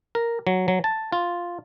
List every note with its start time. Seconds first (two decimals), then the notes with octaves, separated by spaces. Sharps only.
0.15 A#4
0.47 F#3
0.68 F#3
0.84 A5
1.12 F4